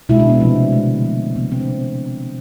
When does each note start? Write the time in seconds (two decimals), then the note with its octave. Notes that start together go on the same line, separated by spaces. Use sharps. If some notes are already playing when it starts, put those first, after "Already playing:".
0.09 B2 G#3 E4
0.20 D4
0.30 B3
0.40 C3 F3 A3 C4
0.56 B3
0.72 D3 F3 G#3
1.04 C3 F3 A3
1.36 C3 F3 A3 B3
1.52 C4
1.60 D4